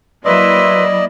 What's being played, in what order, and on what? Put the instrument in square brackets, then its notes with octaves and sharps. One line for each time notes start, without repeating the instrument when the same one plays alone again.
[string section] F#3 A#3 E4 [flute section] B4 C6 E6 [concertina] D5 D#5